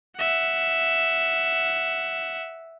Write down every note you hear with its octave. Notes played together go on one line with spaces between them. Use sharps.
E5 F#5